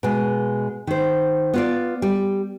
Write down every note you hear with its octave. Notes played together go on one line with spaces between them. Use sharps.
B2 G#3
D#3 C5
B3 F4 D5
G3